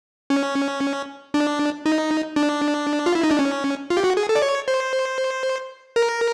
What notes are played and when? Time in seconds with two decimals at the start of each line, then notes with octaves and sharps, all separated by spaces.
0.30 C#4
1.34 D4
1.86 D#4
2.36 D4
3.06 F4
3.15 E4
3.23 D#4
3.31 D4
3.39 C#4
3.90 F4
3.97 G4
4.04 F#4
4.17 G#4
4.29 A4
4.35 D5
4.42 C#5
4.68 C5
5.96 A#4